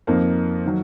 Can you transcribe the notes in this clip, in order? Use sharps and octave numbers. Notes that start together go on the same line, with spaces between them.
F2 F3 A#3 D#4
D#3 F#3